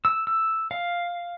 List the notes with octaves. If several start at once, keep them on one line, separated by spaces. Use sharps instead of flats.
E6
E6
F5